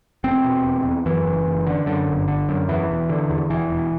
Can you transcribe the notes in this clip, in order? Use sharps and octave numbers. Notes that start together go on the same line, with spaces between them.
E1 C4
B2
E1
E2
F#2 E3
F#1
F#1
D3
F#2 D3
G1
D3
F#2
E2 E3
E1
D3
E2
E1 E3
E1